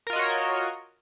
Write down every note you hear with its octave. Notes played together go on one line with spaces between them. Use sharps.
F4 F#4 A#4 C#5 D#5